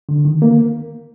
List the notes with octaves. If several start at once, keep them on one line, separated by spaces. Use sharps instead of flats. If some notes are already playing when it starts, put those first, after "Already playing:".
D3
D#3
A#3